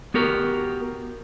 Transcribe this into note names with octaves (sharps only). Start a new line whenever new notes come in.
B3 F#4 G4 A#4